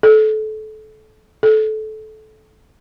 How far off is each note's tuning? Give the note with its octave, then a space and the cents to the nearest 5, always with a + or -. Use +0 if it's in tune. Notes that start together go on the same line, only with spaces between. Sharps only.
A4 -25
A4 -20